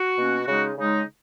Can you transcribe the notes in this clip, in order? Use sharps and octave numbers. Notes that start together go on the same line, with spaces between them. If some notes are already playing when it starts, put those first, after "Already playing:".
Already playing: F#4
B2 A#3 C#4
C#3 G#3 D#4 F#4
C#3 G#3 D#4